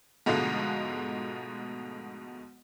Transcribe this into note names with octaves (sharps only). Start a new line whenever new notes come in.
G#2 B2 D3 F3 G#3 A3